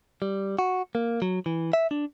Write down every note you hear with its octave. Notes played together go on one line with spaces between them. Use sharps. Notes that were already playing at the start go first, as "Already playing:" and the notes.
G3
F#4
A#3
F#3
E3
E5
D4